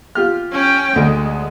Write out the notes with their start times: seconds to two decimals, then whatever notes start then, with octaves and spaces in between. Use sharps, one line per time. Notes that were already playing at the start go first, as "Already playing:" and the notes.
0.15 F4 G4 F6
0.52 C#4 G5
0.96 D2 G#3